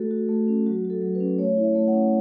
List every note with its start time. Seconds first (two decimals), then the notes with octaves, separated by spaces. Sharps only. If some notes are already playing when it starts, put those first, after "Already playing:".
Already playing: A3 F#4 A4
0.11 F#4
0.29 A3
0.48 C#4
0.66 F#3 F#4
0.85 F#4
0.90 A4
1.02 F#3
1.15 B4
1.20 C#4
1.39 A3 C#5
1.57 E4
1.64 E5
1.75 A3
1.88 F#5
1.93 C#4